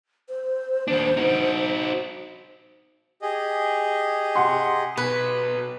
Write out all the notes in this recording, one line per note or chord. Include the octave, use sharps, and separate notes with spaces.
C5
D#2 D4
D#4 F#4
G4 G#4 D#5
C3 F#5 C6
B2 F#3 B3 B4